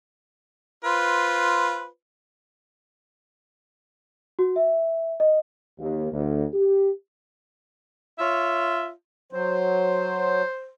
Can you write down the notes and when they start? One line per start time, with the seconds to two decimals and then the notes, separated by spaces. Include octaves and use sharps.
0.84 F4 B4 C5
4.39 F#4
4.56 E5
5.20 D#5
5.79 D#2
6.12 D2
6.53 G4
8.19 F4 C#5 E5
9.33 F#3 C5